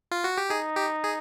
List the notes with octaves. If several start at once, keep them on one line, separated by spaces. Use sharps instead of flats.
F4
F#4
G4
D#4 G#4
G4
G#4